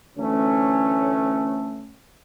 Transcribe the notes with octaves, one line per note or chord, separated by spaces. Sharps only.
D2 E3 A3 C#4